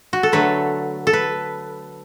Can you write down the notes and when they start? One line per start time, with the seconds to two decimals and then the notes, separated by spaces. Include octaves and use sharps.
0.13 F#4
0.23 A4
0.32 D3 F#3 A3 B4
1.07 A4
1.13 B4